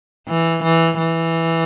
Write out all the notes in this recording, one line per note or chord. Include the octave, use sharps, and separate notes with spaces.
E3
E3
E3